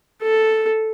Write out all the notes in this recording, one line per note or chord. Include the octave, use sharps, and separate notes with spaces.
A4